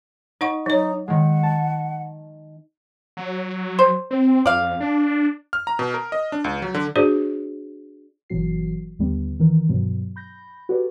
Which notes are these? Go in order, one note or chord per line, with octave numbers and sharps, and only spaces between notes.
D#4 D#5 F#5 C#6
F#3 D#4 C#5
D#3 G#3 F#5
A5
F#3
C5
C4
F2 D5 F5
D4
F6
A#5
B2
A#4
D#5
D4
C#2
F#3
D3
D4 F#4 G#4 C5 D5
G1 B2 E3 F#3 F#4 C7
D#2 D3 G3 B3
D#3 E3 A#4
G2 B2 F#3
B5 G6 A#6
F#4 G4 A4 B4 D5